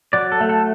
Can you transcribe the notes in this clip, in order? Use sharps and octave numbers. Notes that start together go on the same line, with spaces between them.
F#3 D5
A4
A3
A4